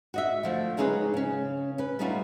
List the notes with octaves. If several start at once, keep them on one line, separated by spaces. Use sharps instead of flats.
F#4 D#5 E5
D3 F3 A3
F#3 G#3 C#4 D#4 G#4 B4
C#3 C#4
C#4 B4
G3 A3 C#4 D#4 F4 F#4